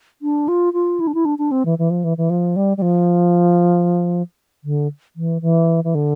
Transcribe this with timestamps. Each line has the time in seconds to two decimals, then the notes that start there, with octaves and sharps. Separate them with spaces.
0.22 D4
0.48 F4
0.73 F4
1.00 E4
1.07 D4
1.15 E4
1.25 D4
1.39 D4
1.51 C4
1.66 E3
1.79 E3
1.90 F3
2.04 E3
2.18 E3
2.30 F3
2.56 G3
2.77 G3
2.82 F3
4.64 D3
5.16 E3
5.42 E3
5.84 E3
5.95 D3